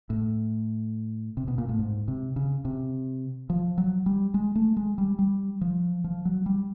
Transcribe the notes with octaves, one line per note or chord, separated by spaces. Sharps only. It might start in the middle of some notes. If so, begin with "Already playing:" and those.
A2
C3
B2
A#2
A2
G#2
C3
C#3
C3
F3
F#3
G3
G#3
A3
G#3
G3
G3
F3
F3
F#3
G3